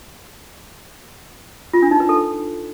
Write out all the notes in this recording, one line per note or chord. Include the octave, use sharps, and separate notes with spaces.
F4
D4
D#4
B4
A4